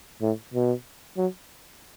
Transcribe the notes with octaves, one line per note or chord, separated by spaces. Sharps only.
A2
B2
F#3